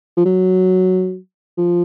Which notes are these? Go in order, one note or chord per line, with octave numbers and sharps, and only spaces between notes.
F3
F#3
F3